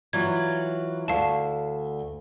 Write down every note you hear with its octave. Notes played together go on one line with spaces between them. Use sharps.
E3 F#3 F4 G#6
D2 F5 A5